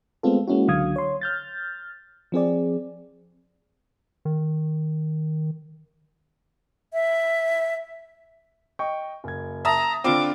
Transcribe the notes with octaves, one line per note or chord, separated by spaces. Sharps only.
G#3 A3 B3 C4 F4 A4
G#3 A#3 C#4 E4 F#4
C#2 D3 F#3 F5 D#6 G#6
C#5 C6
F6 G6 A6
F3 C4 G#4 D5
D#3
E5
D#5 G5 C#6
F#1 G#6
E5 A5 A#5 D#6
D3 C4 D4 F4 B5 D6